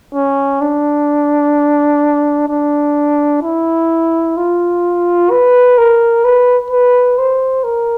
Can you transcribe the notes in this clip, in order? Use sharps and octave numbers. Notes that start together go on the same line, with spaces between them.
C#4
D4
D4
E4
F4
B4
A#4
B4
B4
C5
A#4